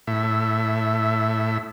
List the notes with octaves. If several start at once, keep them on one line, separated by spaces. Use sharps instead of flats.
A2 E5